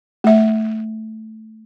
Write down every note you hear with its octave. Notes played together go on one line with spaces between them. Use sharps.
A3 E5